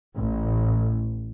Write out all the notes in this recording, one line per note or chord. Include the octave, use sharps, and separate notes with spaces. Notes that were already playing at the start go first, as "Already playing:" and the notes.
A1